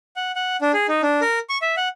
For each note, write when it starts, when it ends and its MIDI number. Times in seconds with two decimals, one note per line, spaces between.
0.16 0.32 78
0.36 0.57 78
0.61 0.72 62
0.73 0.87 68
0.88 1.02 63
1.02 1.21 62
1.21 1.39 70
1.49 1.58 85
1.62 1.75 76
1.77 1.89 78